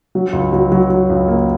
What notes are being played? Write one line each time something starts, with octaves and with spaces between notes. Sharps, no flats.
F#3
C#2
F#3
F#3
F#3
C#2
A#3